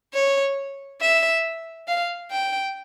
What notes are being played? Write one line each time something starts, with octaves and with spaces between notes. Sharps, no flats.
C#5
E5
F5
G5